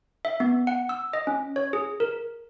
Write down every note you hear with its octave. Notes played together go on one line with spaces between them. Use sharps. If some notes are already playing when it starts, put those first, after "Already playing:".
E5
B3
F#5
E6
D#5
C#4
C#5
G#4
A#4